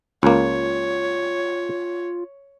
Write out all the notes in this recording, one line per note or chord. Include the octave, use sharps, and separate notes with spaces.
C#2 A#3 F4 C#5